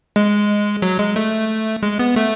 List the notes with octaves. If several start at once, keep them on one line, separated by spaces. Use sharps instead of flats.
G#3
F#3
G#3
A3
G#3
B3
A3